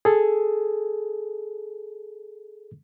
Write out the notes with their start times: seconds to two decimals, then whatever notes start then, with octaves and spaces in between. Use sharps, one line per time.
0.05 G#4 A4